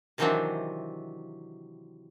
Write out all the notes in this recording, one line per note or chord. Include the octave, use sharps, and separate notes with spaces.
C3 D#3 E3 F#3 C4 D4